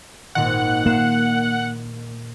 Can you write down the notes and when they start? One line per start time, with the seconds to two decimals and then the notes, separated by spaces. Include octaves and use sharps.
0.35 G#1 A#2 D#3 F#5
0.86 A#2 A#3 C7 E7